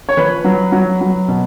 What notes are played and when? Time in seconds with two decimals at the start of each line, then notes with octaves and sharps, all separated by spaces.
0.09 C#5
0.17 F3 B4
0.44 F#3
0.72 F#3
1.01 F#3
1.28 B2